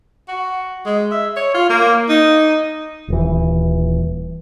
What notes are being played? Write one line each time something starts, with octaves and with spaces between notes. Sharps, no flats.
F#4
G#3
E5
C#5
F4
A#3
D#4
D#1 E3